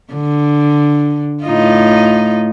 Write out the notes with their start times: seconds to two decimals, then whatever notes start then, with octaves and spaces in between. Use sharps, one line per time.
0.13 D3
1.44 A2 D#4 F4